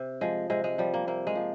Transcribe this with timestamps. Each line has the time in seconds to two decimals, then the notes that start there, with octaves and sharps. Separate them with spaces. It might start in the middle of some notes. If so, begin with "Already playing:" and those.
Already playing: C3
0.21 F3 G#3
0.50 C3 G#3
0.64 G#3
0.78 F3 G3
0.94 A#3
1.07 C3 A#3
1.27 G#3
1.35 F3